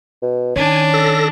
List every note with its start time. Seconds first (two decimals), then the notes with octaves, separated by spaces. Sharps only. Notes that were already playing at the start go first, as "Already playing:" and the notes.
0.22 B2
0.56 D#3 C#4 D4 G#5
0.94 A4 A#6